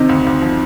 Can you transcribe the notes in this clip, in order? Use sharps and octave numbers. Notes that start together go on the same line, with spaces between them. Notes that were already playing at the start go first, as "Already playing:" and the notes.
Already playing: C3 D#3 C4 D#4
D2
D2
F3